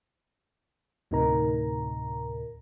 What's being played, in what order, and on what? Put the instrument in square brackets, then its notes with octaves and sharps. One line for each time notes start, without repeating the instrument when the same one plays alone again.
[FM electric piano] D2 A2 C3 D#4 A#4 A#5